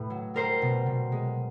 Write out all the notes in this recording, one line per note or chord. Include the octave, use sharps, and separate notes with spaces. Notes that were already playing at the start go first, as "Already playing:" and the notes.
Already playing: A2 B4
F#3
G3 A#4 C5
B2
B2
G#3